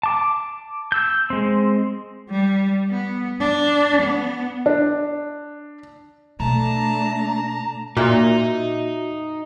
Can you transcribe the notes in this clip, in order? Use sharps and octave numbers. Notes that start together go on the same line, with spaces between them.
A5 D6
E6 G6
G#3 C4
G3
B3
D4
B3
D4
B2 A3 D4 A5 A#5
A#2 D#4 F#4 E5 A#5